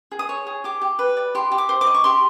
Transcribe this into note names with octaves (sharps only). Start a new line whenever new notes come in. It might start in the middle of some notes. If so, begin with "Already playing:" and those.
G#4
D#6
C#5
G#4
G4 D6
G4
B4
D5
G4 C6
G4
D6
C5
D6
D#5
C#6
G4 C6